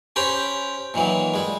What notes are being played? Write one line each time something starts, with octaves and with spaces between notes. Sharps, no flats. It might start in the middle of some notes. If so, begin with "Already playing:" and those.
C#4 G4 C5 A#5 B5
A#2 D#3 E3 F#3
G3 G#3